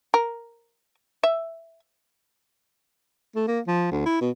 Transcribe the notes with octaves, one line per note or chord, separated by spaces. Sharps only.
A#4
E5
A3
A#3
F3
D2
E4
B2